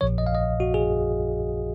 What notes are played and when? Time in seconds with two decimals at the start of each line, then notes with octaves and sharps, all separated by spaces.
0.01 A#1 A#2 F3 C#5
0.18 D#5
0.27 F5
0.35 D#5
0.60 F#4
0.74 G#4